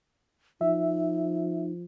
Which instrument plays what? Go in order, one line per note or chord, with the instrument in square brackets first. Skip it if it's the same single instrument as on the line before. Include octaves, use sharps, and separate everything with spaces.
[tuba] F3 [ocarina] D#4 [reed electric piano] E5